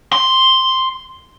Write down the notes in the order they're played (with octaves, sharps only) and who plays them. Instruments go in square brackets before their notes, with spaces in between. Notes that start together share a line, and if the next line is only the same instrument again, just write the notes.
[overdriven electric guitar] C6